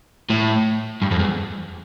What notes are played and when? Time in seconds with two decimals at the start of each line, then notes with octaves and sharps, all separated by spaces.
0.30 A2
1.02 G2
1.11 F2
1.19 E2